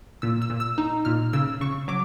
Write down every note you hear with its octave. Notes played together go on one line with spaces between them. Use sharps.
A#2 E6
E6
A#2
E6
D#4
A#2 F6
C#3 E6
C#3 C#6
F#3 D6